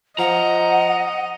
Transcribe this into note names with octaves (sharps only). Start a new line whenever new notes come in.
F3 D#5 F#5 A#5